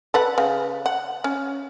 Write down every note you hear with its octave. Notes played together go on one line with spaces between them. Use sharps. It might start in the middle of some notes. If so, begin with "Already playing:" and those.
A4 B4 F#5
C#3
F#5
C#4